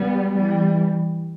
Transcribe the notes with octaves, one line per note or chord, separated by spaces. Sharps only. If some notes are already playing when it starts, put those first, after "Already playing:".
Already playing: G3 B3
E3 G3